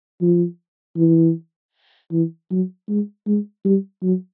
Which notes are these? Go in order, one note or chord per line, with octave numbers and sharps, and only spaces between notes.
F3
E3
E3
F#3
G#3
G#3
G3
F#3